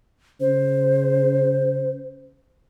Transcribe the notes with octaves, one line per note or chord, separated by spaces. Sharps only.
C#3 C5